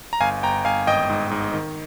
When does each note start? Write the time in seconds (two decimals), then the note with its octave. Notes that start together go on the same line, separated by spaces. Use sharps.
0.13 A#5
0.21 G1 F5 G#5
0.43 G1 G5 A#5
0.65 G1 F5 G#5
0.87 G#1 D#5 G5
1.09 G#2
1.31 G#2
1.53 D#3